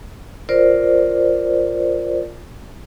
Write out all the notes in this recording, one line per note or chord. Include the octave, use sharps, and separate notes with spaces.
F4 A#4 C5 D5